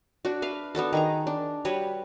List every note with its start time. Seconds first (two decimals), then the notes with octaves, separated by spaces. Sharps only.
0.25 D4 F#4
0.42 B4 E5 F5
0.75 B3 D4 F#4 A4
0.93 D#3 G#4 A#5
1.27 D4
1.65 G3 F#4 B4 C#5